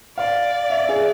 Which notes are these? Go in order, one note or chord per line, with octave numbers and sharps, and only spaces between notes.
D5 F5
E5
G#4